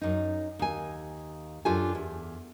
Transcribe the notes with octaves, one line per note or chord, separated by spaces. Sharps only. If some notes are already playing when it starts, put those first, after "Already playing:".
F#2 D#4
D#2 G#5
F#2 D4 F4 G4 A4 G#5
E2